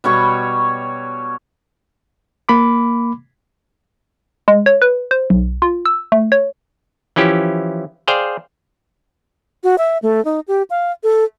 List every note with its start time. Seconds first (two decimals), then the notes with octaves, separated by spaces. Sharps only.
0.04 B2 G3 C#5 C#6
2.49 A#3 B5 D6
4.48 G#3
4.66 C#5
4.82 B4
5.11 C5
5.30 B1
5.62 F4
5.86 E6
6.12 A3
6.32 C#5
7.16 E3 F3 C#4 E4 G4
8.08 G#4 C5 D5 F5 G5
9.64 F#4
9.78 E5
10.02 A3
10.25 D#4
10.48 G4
10.70 F5
11.03 A4